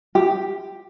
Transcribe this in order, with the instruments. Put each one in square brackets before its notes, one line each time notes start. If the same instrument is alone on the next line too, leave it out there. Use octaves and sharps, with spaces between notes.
[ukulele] G4